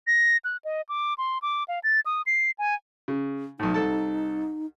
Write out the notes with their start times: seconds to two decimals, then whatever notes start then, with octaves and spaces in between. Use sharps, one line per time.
0.07 A#6
0.45 F#6
0.65 D#5
0.89 D6
1.18 C6
1.42 D6
1.68 F5
1.84 A6
2.06 D#6
2.26 C7
2.59 G#5
3.08 C#3
3.59 B1 A2 D#4
3.74 C2 A4 A5